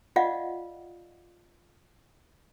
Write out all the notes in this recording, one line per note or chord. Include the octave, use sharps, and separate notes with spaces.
F4 D5 D#5 F5 F#5